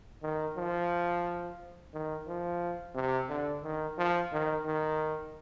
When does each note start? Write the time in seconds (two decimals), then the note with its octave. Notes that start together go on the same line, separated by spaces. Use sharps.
0.23 D#3
0.57 F3
1.94 D#3
2.27 F3
2.95 C3
3.30 D3
3.64 D#3
3.98 F3
4.33 D#3
4.66 D#3